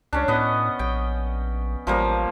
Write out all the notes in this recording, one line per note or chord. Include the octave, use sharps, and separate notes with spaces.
C#2 C#4 D4
A2 B3 D#5
A#1 G5
A1 F3 G3 A#3